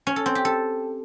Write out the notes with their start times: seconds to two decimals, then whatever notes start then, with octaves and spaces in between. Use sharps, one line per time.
0.07 C#4
0.16 A4
0.26 C4
0.35 G4
0.45 A4